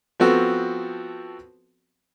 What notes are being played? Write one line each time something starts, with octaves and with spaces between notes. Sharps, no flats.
F3 B3 C4 F#4 A4